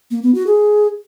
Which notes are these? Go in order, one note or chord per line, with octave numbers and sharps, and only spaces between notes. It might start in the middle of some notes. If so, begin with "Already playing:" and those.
A#3
B3
F#4
G#4